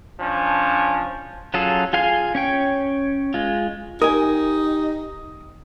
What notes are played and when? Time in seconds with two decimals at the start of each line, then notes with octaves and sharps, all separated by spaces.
0.19 F3 C#4 D4
1.54 F#3 C#4 F4 G#4 A4
1.93 F4 G#4 F5 G#5 C6
2.35 C#4 C#5 G5
3.34 G#3 F4
4.02 D#4 G4 A#4 G#5 D#6